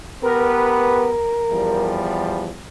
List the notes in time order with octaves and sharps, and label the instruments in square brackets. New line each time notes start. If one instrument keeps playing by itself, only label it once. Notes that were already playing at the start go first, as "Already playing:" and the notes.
[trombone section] B3 G4 B4 [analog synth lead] A#4
[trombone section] E2 F3 G3